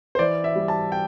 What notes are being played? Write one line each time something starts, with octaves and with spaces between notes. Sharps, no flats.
C5
E3 D5
E5
G3
A5
G5